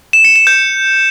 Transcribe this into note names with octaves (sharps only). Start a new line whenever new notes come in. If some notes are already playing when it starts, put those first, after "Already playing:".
E7
C#7
E7
G6